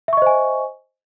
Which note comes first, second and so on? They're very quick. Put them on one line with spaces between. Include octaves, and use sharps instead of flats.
E5 C#6 D#5 C5 G#5